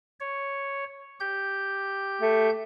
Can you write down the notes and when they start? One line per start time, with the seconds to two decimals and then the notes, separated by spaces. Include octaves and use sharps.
0.20 C#5
1.20 G4 G6
2.21 A3